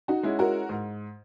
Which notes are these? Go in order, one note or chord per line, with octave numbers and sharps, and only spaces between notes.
D#4 F#4
G#3 C#4 E4
F#4 A#4
G#2